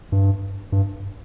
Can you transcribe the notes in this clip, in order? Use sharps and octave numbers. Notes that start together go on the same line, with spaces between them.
G2
G2